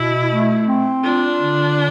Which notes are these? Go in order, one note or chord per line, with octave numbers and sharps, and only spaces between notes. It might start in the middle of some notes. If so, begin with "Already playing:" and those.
Already playing: B2 E4
A3
C4
D4 F4
D3